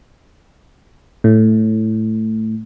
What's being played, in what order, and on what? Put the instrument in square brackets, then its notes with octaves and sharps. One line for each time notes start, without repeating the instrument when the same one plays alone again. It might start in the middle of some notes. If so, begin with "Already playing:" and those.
[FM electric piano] A2